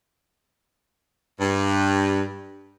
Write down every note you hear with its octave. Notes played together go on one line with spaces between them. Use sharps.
G2